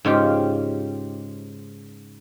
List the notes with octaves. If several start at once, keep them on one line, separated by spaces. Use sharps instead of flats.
G#2 C#3 F4 G4